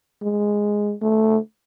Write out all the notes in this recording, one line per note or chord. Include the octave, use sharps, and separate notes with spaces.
G#3
A3